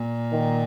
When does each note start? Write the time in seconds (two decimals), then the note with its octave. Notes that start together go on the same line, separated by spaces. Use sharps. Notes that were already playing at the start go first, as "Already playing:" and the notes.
Already playing: A#2
0.32 D#3